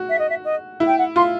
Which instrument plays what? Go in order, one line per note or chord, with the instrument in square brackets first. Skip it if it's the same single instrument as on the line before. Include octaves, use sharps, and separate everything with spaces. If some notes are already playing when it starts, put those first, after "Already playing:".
Already playing: [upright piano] F#4
[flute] E5
D#5
E5
D#5
[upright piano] E4
[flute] G5
F#5
[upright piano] F4 [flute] C6